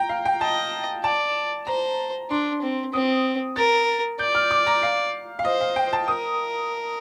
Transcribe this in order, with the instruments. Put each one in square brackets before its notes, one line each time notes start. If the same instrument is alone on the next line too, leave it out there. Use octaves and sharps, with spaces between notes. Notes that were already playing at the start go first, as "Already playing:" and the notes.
Already playing: [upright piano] G5 A#5
F5
G5
[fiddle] D#5 [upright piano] A5
[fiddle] D5 [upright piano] A5
[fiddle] C5 [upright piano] A#5
[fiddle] D4 [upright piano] C6
[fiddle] C4
[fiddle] C4 [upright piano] D#6
[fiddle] A#4 [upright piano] A6
[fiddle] D5 [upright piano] G6
[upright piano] F6
D6
A#5
F5
F5
[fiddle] C5 [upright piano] D#5
[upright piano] F5
G5
A5
[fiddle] A#4 [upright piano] D#6